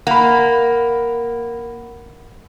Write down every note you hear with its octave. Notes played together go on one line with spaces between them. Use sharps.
A#3 F#5 B5